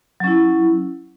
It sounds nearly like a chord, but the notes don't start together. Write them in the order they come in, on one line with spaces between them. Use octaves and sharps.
F#3 C#4 E4